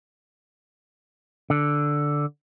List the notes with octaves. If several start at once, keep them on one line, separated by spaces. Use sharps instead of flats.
D3